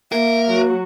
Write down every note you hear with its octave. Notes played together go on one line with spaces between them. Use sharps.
A#3 A#4 E5
F#3 F#4